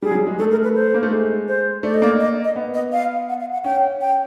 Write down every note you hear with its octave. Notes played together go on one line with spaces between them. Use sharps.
G3 G#4
F#3
G3
G#3
A3 A4
A#4
B4
C5
A#3
A3
G#3
C5
A3 D5
D#5
A#3 D5
D#5
D#5
B3
D#5
F5
F#5
F5
F#5
C#4 G5
G5